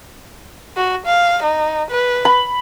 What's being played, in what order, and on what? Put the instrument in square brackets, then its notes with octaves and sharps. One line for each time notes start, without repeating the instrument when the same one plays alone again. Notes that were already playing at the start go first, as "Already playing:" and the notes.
[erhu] F#4
F5
D#4
B4
[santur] B5